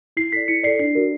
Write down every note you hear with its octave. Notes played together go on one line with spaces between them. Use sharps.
E4 C7
A4 D5 B6
E4 C#7
A4 D5 C7
D4 C7
F#4 A#4 D5